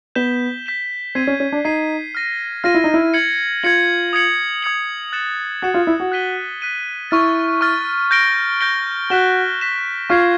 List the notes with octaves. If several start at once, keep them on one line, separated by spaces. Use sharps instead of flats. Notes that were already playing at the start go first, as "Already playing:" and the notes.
B3 G6 B6 E7 G7
G6 B6 E7 G7
C4 G#6 C7 D#7
C#4
C#4
D4
D#4 G#6 C7 D#7
F6 A#6 D#7
F4 F6 A#6 D#7
E4
D#4
E4
G#6 C#7 F#7
F4 G#6 C#7 F#7
D#6 G#6 C#7 F#7
D#6 G#6 C#7 F#7
F#6 A6 C#7 E7
F#4 F#6 A6 C#7 E7
F4
E4
F#4
F#6 B6 D#7 G7
F#6 B6 D#7 G7
E4 C#6 F6 A6
C#6 F6 A6
G6 A#6 D7 G7
G6 A#6 D7 G7
F#4 F#6 B6 E7 G7
F#6 B6 E7 G7
F4 C#6 F6 G#6 C7